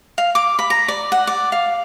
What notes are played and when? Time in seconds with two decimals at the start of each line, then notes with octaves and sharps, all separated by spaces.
0.18 F5
0.35 D6
0.59 B5
0.70 A#5
0.88 D5
1.12 F#5
1.27 D5
1.52 F5